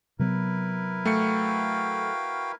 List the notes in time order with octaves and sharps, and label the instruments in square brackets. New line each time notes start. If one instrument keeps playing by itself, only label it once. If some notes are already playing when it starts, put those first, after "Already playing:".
[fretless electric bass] C3 F#3 B3 [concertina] E4 A#4 B4
[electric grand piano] A3 C#7 [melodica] F#4 F5 G5